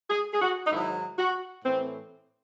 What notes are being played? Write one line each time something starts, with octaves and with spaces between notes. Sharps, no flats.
G#4
G#4
F#4
D#4
G#2 D#3 F#3 E4
F#4
A2 E3 C4